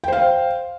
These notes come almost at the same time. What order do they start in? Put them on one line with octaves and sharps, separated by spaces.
G5 C5 F5